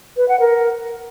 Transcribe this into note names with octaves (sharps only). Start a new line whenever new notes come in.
B4
F#5
A#4